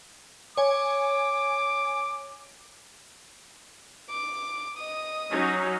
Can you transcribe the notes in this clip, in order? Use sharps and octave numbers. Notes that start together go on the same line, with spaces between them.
C#5 G#5 D6
D6
D#5 D#6
F#3 C#4 D#4